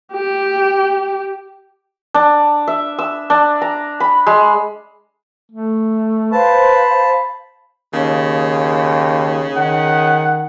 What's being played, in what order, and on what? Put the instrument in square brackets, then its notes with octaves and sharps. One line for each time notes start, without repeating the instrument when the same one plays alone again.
[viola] G4
[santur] D4
E5
E6
D4
A#5
B5
G#3
[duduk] A3
[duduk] B4 [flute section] C5 F5 [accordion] A5 [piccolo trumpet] B5
[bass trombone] D#2 [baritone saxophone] C#3
[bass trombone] D#3 [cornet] F#5